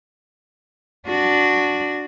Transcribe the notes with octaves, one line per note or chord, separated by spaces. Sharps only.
D4 F#4